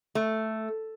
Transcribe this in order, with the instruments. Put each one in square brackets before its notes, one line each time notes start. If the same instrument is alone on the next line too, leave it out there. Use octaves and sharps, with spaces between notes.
[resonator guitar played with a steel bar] A3